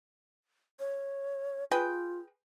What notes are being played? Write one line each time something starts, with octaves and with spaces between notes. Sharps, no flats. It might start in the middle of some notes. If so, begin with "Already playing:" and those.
C#5
F4 G#4 B4 G5